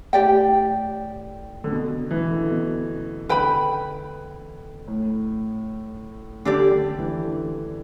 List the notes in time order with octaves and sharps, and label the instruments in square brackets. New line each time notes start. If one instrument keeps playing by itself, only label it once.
[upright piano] A2 [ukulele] G4 D5 G5
[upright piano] D3
B2
E3
D3
B2
[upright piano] D3 [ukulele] B4 G5 B5
[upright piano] A2
[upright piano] D3 [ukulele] D4 G4 D5
[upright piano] D3
E3
D3